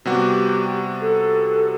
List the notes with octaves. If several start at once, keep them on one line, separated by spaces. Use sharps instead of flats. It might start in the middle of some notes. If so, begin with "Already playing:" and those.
C3 G3 B3 F#4 G4
A4